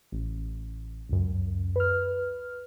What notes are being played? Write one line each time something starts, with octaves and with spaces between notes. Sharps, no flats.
A1
C#2 F#2
B4 F6